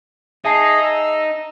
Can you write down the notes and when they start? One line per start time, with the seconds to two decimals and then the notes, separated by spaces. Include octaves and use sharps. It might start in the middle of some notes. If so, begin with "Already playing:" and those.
0.45 D#4 G#4 E5 A5 C7
0.83 E6